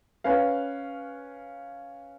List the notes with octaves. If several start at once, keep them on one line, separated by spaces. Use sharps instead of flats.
C#4 B4 F5